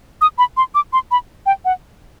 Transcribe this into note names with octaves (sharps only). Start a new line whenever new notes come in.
D#6
B5
C6
D6
C6
B5
G5
F#5